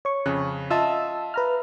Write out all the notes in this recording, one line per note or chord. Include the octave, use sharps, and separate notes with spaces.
C#5 C#6
F2 C#3 F#6
F4 D#5 E5 A5 E6
B4 A#5 F6